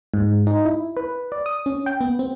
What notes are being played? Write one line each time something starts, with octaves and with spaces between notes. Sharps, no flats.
G#2
D#4
E4
B4
D5
D#6
C#4
G5
B3
C4